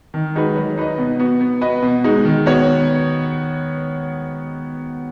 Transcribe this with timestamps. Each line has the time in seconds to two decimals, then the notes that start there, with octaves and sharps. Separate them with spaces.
0.14 D#3
0.35 G#3 D#4 F#4 B4
0.56 F#3
0.77 D#4 B4 D#5
0.98 B2
1.19 B3 F#4
1.40 B3
1.61 F#4 B4 D#5
1.82 B2
2.04 G#3 D#4 F#4
2.25 D#3
2.46 B3 F#4 C#5